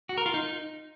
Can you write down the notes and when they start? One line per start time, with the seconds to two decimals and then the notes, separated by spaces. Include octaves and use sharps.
0.09 F#4
0.18 A#4
0.26 F4
0.34 D#4